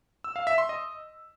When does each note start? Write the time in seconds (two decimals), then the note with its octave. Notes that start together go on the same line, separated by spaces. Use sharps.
0.24 E6
0.36 F5
0.47 E5
0.58 C6
0.69 D#5